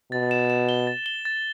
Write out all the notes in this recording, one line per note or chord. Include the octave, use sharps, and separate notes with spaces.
B2 A6
E7
E7
G7
A6
G7
A6